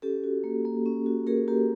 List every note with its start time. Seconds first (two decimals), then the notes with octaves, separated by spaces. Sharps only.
0.02 C#4 G4 A4
0.24 F#4
0.44 A#3
0.65 A#3
0.86 C#4
1.06 F#4
1.27 A#3 G#4 A#4
1.48 A#3 G4